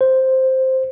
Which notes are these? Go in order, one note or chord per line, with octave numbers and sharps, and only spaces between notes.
C5